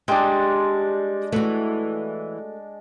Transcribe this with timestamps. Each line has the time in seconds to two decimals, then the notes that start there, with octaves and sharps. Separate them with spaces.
0.08 G3 G#3 D4 G5
1.32 E3 A3 F#4